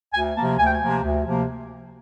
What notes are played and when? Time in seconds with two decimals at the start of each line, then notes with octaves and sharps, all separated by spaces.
0.14 D2 G#5
0.36 C3 F3 A#3 A5
0.58 D2 G#5
0.65 G5
0.72 G#5
0.81 C3 F3 A#3
1.03 D2
1.26 C3 F3 A#3